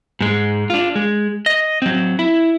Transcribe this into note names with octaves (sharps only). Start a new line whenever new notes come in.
G#2 G#3
D4 F4
G#3
D#5
F#3 C4
E4